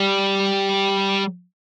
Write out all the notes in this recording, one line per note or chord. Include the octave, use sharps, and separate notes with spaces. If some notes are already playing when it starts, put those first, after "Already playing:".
Already playing: G3